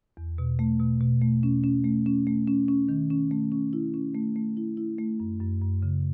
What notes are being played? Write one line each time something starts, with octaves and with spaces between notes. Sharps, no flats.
E2
B2
A3
B2
B2
A3
C#4
C#4
A3
C#4
A3
C#4
C#4
D#3
C#4
A3
C#4
E4
C#4
A3
A3
E4
E4
A3
F#2
F#2
F#2
C#3